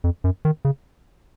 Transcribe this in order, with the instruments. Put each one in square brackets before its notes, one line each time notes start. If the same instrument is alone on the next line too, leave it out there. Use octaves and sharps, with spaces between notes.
[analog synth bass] F2
F#2
D#3
C#3